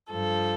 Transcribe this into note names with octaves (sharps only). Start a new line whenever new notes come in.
G2 F3 A4